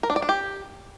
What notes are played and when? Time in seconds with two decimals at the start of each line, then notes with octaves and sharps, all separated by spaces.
0.03 A#4
0.10 D4
0.16 D5
0.22 D4
0.29 G4